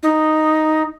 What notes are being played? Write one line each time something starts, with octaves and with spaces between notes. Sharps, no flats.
D#4